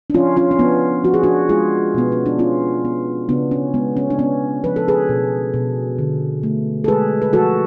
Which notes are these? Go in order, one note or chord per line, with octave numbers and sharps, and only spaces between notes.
D4
F3 C#4 F4
C#4 F4
C#4
F3 B3 D4
F3 F#4
G#4
D4 F#4
G#3 F4 G#4
B2 B3
C#4
D4
B3 C#4 F4
B3
C#3 B3 D4
C#4
G#3 B3
C#4
D4
B3 C#4
F3 B4
A4
G#4 B4
B2
B2
D3
A3
A4
G#3 G#4 B4
B4
F3 F#4 A4